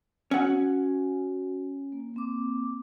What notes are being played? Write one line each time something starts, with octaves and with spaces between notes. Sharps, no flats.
C#4 F#4 F#5
A#3
A#3 C4 D6